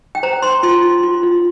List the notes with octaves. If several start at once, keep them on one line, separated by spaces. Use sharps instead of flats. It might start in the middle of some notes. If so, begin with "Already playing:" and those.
G5
C5 A#5
C5 C6
F4 C6
F4
F4
F4